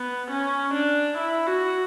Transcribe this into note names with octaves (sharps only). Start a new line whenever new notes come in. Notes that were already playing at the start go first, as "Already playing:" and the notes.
Already playing: B3
C#4
D4
E4
F#4